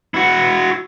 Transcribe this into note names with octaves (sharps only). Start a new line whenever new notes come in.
E4 F#4